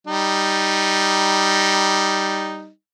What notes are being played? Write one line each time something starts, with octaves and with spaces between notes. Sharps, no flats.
G3 D#4